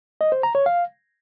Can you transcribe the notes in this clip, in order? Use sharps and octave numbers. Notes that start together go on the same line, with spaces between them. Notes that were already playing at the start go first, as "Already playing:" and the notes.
D#5
C5
A#5
C#5
F5